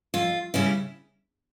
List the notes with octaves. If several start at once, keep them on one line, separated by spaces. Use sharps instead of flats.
F2 F4
C#3 G3 C#4 E4